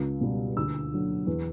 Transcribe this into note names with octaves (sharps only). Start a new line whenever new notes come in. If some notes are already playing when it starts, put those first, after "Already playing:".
Already playing: C#2
B2 G3
D2 E6
D3 F#3
E2